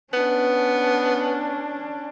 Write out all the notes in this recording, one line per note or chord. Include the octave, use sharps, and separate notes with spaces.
B3 C#4 D4